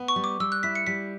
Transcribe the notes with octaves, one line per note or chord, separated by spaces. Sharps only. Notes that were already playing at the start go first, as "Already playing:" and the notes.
Already playing: B3
C#6
G3
D6
G3 E6
F#6
E4 B6
C#7
G3 B6